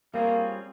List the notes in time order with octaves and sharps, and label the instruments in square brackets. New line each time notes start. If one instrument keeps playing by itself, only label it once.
[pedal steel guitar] G3 C4 F4 G#4 C#5 [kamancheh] A#3